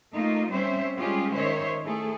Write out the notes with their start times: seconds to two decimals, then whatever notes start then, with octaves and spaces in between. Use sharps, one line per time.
0.12 A3 A#3 D#4 F4
0.51 G3 C4 C#4 C5 C#5 E5
0.98 G3 G#3 C#4 F4 G4 G#4
1.33 D#3 C5 C#5 E5
1.84 A3 E4 G#4 A4